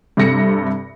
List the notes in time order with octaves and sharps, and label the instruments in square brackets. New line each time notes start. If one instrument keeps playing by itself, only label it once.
[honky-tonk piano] G2 C3 A4 A#6 C#7